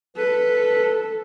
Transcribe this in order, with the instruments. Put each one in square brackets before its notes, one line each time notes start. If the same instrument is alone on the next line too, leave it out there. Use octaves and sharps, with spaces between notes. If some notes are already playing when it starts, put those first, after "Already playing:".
[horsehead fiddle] A4 [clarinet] B4